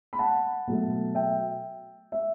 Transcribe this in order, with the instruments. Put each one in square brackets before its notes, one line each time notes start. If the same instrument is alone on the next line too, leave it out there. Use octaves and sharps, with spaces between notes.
[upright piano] B5
F#5 A5
B2 F#3 A3
E5 G5
E5